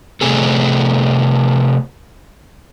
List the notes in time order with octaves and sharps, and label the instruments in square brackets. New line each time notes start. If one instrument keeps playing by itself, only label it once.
[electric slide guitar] C3 A3 C4 G#4 A4